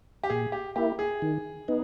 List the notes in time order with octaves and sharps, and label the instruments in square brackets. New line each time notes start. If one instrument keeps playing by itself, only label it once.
[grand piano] G4
[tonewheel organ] A#2 [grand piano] G#4
[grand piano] G4
[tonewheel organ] A#3 E4 [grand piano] G4
[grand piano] G#4
[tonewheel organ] D#3
B3 D#4